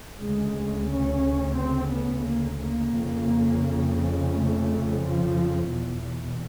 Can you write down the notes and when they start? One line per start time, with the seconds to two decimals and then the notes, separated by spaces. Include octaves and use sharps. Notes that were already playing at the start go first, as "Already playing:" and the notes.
0.21 D2 C#3 G#3
0.89 C#4
1.58 C4
1.92 B3
2.27 A#3
2.61 A#3
2.95 F2 C#3
4.33 A3
5.01 F3
5.70 E2 B2